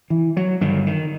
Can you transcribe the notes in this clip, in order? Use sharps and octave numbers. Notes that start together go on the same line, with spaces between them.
E3
F#3
G2 D3 D#3
D#3